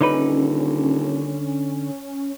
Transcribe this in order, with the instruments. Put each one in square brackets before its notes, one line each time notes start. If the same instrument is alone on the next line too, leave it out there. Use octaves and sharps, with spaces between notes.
[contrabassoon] D#1 [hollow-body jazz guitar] D3 D#4 B4 [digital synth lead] C#4